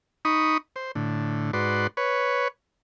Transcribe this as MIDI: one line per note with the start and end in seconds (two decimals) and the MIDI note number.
0.25 0.58 63
0.25 0.58 83
0.25 0.58 85
0.25 0.58 87
0.76 0.92 72
0.95 1.51 45
0.95 1.51 50
1.53 1.87 44
1.53 1.87 66
1.53 1.87 71
1.53 1.87 74
1.53 1.87 84
1.97 2.48 71
1.97 2.48 73